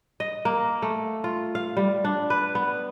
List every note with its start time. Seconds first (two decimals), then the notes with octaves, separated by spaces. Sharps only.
0.20 D#5
0.45 A#3
0.82 A3
1.24 F4
1.55 F5
1.77 G3
2.05 D4
2.30 B4
2.55 B3